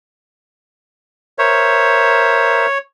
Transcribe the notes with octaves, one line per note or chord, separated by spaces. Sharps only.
A#4 C5 C#5 E5